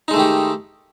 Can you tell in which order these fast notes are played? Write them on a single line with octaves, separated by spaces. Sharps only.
D#4 G#3 A3 D#3 G4